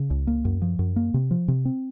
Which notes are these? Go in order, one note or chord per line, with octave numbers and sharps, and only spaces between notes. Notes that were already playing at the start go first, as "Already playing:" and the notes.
Already playing: C#3
C#2
A#3
F#2
F3
F#2
A#3
C3
F3
C3
C4